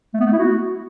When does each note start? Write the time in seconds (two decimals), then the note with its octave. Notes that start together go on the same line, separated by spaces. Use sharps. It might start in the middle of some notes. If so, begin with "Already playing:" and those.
0.14 A3
0.20 B3
0.27 A3
0.33 E4
0.39 F#4